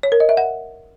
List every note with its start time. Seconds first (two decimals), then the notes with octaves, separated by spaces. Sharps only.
0.03 C#5
0.12 A#4
0.20 D#5
0.29 E5
0.37 F#5